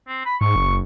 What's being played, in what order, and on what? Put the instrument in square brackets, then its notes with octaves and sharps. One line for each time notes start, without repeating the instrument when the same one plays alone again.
[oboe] C4
B5
[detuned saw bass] G#2 [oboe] C#6
[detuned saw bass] F#1